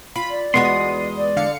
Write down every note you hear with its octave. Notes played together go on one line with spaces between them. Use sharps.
F4 B5
D5
E2 G#3 B3 F#4 C6 D#6
D5
D3 F5 C#7